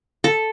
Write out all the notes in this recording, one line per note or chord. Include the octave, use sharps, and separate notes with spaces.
A4